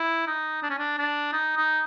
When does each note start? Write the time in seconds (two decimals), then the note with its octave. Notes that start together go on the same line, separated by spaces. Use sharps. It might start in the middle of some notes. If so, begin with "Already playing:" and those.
Already playing: E4
0.27 D#4
0.62 D4
0.70 C#4
0.78 D4
0.98 D4
1.33 D#4
1.57 D#4